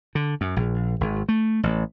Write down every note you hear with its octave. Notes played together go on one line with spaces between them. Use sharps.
D3
F#2
A#1
G#1
A3
A1